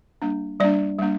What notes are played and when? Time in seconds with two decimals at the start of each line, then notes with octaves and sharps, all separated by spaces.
0.22 G3 A#3 D4
0.60 G3 A#3 D4 D5
0.99 G3 A#3 D4